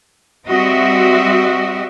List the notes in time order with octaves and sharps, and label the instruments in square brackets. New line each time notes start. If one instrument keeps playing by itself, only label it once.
[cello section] G3 C4 F#4 D#5 E5